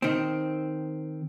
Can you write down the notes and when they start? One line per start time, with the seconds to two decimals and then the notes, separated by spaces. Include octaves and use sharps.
0.02 D#3 C4